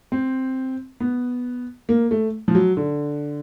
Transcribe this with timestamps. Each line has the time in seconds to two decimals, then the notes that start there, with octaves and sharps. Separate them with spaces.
0.12 C4
1.00 B3
1.89 A#3
2.11 A3
2.48 F3
2.55 F#3
2.77 D3